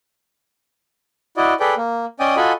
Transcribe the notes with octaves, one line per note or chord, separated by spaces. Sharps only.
E4 F#4 D5 D#5
G#4 A4 B4 D5 G5
A#3
C#4 D5 D#5 G5 G#5 D#6
F4 F#4 A4 D#5 G#5 B5